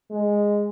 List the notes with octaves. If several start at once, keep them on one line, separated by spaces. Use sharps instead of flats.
G#3